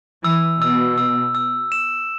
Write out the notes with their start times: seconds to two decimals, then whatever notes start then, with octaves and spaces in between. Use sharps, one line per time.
0.24 E3 E6
0.61 B2 E6
0.98 E6
1.35 E6
1.72 E7